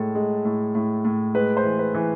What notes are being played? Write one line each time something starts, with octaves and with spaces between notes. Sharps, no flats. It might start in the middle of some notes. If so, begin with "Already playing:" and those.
Already playing: A2 G#3 A4
G#3
A2
A2
A2
G#3 B4
C5
E3
B4
E3